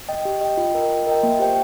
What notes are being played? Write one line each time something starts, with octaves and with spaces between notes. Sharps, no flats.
D#5 G5
G4
D#5 G5
F4
A#4 D#5 G5
F4
A#4 D#5 G5
A#3
G4 C5 G5